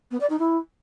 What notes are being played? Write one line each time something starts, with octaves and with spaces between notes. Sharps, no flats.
B3
D5
D#4
E4